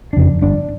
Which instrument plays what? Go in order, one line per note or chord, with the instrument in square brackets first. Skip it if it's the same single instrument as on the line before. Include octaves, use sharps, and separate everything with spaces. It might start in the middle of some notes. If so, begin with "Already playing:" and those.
[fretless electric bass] F2 C#3 D4
G1 D4